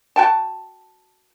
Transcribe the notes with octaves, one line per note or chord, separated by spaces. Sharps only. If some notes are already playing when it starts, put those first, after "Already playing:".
F#4 G5 A5